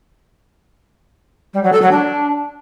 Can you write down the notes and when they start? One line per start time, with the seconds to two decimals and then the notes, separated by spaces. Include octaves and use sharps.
1.53 G3
1.63 F#3
1.72 A4
1.81 F#3
1.91 D4